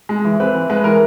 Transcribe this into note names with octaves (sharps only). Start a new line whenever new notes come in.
G#3
E3
C4 B4
E3
G#3 B4
E3 A#4